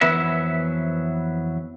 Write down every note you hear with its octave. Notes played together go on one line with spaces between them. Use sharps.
F2 E3 F#3 B3 B4 E5